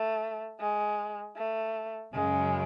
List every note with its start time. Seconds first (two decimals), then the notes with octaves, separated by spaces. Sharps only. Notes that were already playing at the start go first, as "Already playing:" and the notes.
Already playing: A3
0.59 G#3
1.36 A3
2.13 F#2 C#3 F#3 G#3